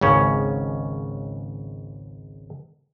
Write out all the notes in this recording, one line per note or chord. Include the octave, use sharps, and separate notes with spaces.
G#1 C#2 C#3 C#4